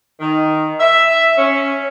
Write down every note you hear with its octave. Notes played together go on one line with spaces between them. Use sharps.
D#3
E5
C#4